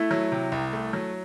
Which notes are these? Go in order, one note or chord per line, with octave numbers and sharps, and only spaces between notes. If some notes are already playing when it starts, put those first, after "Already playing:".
Already playing: A3 E4
F#3
C3
C2
A3
F#3